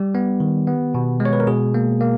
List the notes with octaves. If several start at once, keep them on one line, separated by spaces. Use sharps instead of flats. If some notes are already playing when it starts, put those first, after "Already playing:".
Already playing: G3 G4
B3
D#3
B3
B2
G#3
C#5
B4
A#4
B2 G#4
A#3
A#3